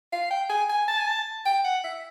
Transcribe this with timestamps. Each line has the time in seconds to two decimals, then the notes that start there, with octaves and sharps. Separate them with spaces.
0.12 F5
0.31 G5
0.50 G#5
0.69 G#5
0.88 A5
0.98 G#5
1.07 A5
1.46 G5
1.64 F#5
1.84 E5